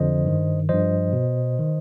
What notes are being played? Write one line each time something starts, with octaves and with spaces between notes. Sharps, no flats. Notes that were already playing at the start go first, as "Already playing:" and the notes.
Already playing: F2 D3 F3 C5 D#5
G2 D#3
G2 F3 C5 D#5
B2
D#3